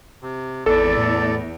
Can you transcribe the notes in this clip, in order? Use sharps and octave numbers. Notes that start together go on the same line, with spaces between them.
C3
G#1 E2 A4 D5
A2